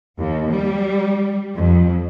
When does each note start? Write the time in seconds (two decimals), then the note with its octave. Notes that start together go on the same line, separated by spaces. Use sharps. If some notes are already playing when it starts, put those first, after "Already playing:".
0.17 D#2
0.50 G3
1.56 F2